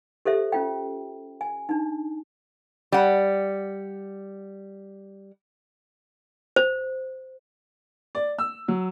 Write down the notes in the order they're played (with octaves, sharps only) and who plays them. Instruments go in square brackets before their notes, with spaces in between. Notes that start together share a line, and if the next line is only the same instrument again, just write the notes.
[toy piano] G4 A4 C5 E5
C#4 F4 G5
G#5
D4 D#4
[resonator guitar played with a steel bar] G3 F#5
[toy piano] C5
[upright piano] D5
E6
F#3